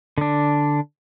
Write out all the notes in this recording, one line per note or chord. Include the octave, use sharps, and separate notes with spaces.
D3 D4